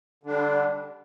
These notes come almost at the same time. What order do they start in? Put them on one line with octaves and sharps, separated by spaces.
D3 D4 G3